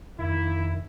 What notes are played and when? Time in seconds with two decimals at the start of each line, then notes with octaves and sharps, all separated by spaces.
0.19 F2 D#3 A#3 E4